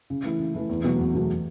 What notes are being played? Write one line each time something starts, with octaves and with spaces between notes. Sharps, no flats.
C#3
E3 A3 E4
C#3
E3 A3 E4
E2
B2 F#3 A3
E2
B2 F#3 A3